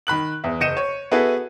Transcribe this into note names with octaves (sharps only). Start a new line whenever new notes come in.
D#3 B5 F#6 F#7
E2 E5
F#1 D#5 G6 C#7 D#7 E7
C#5
B3 E4 F#4 G#4 A4 B4